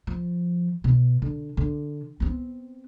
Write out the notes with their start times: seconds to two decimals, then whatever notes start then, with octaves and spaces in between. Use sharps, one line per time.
0.07 F3
0.84 B2
1.22 D3
1.57 D3
2.20 B3 C4